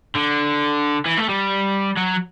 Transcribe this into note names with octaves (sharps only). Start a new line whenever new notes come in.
D3
E3
A3
G3
F#3